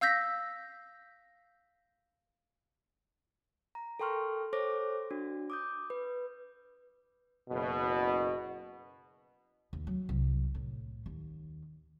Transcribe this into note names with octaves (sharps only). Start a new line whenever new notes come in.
F5 E6 G6 A#6 B6
A#5
A4 A#4 G5 C6 C#6 F6
A4 C5 C#5 D6 A#6
D4 F#4
D6 D#6 G6
B4
F#1 B2
D#2
F#3
C2
A2
D#2